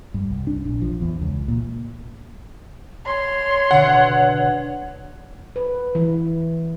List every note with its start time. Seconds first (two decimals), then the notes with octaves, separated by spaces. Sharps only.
0.14 G2
0.30 C2
0.47 D4
0.66 A#1
0.82 F3
1.01 E2
1.22 C#2
1.48 A#2
3.06 C#5 C6
3.71 B2 D3 F#5
5.56 B4
5.95 E3